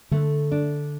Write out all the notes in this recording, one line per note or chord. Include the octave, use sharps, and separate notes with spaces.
D3 A3
D4